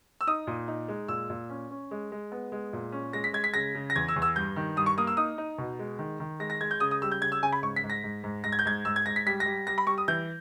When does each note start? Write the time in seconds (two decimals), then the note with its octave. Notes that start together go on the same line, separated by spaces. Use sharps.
0.21 E6
0.27 D#4 D#6
0.47 A#2
0.68 D#4
0.88 G#3
1.08 A#2 E6
1.30 A#2
1.50 C#4
1.70 C#4
1.91 G#3
2.12 G#3
2.32 B3
2.52 G#3
2.73 A#2
2.92 C#4
3.13 G#3 A#6
3.24 B6
3.33 G#3 G#6
3.44 B6
3.54 C#3 A#6
3.75 C#3
3.90 A#6
3.96 E2 G#6
4.08 E6
4.16 E2
4.22 E6
4.35 G2 G6
4.56 D#3
4.76 G2 D#6
4.86 C#6
4.98 A#3 D#6
5.07 E6
5.17 D#4 D#6
5.38 D#4
5.58 B2
5.79 G#3
5.99 D#3
6.20 D#3
6.40 G#3 A#6
6.50 A#6
6.61 G#3 G#6
6.71 G6
6.80 C#3 D#6
6.91 D#6
7.02 G3 E6
7.12 G6
7.21 C#3 G#6
7.32 E6
7.42 C#3 G#5
7.52 B5
7.62 G#2 C#6
7.76 B6
7.83 G#2
7.90 A#6
8.04 G#2
8.24 G#2
8.44 G#2 A#6
8.52 G#6
8.59 G6
8.65 G#2 G#6
8.85 G#2 E6
8.96 G#6
9.06 G#2 A#6
9.16 B6
9.26 G3 B6
9.40 A#6
9.46 G3
9.67 G3 A#6
9.78 B5
9.87 G3 C#6
9.98 D#6
10.08 E3 G6